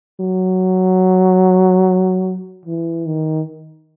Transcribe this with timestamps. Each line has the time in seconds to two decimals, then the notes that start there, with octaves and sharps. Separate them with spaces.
0.20 F#3
2.66 E3
3.06 D#3